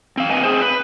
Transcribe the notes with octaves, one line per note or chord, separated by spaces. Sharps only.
C4 F5
A3 C4 B4 D#5 G#5
C4 G#4 C5
B4